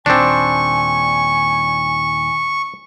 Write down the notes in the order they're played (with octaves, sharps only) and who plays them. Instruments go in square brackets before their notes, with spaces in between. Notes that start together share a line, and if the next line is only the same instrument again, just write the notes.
[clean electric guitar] D#2 A#2 G3 [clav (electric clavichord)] C4 D4 [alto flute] G#5 [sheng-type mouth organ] C#6